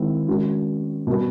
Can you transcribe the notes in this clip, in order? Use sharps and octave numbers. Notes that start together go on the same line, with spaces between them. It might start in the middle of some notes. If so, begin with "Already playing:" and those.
Already playing: D#3 G#3 C4 E4
D#3 G#3 C#4 F#4
B2 G3 B3